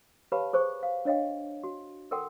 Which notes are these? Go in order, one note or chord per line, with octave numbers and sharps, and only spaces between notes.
G4 B4 C#5 F5 A5 B5
G#4 C5 C#6
F5
D4 C#5 D#5 F5 G5
F#4
A4 A#4 F#5 G5 C6